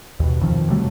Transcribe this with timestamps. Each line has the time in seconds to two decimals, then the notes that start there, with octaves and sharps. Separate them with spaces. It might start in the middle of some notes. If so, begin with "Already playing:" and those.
0.20 D#2 B2
0.41 F2 D#3 F3
0.70 C3 F#3 G3 A3